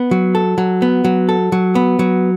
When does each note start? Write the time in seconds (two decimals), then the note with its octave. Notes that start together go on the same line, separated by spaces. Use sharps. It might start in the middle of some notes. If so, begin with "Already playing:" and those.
Already playing: B3
0.11 F#3
0.35 A4
0.58 F#3
0.82 B3
1.04 F#3
1.29 A4
1.52 F#3
1.75 B3
1.99 F#3